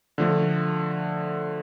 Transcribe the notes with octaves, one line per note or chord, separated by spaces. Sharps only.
D3 F3 A3